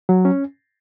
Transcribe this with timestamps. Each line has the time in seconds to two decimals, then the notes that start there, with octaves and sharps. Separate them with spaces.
0.09 F#3
0.25 C#4